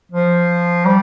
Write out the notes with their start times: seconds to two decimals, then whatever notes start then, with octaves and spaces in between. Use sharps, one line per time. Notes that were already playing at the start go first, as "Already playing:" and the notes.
0.12 F3
0.86 G3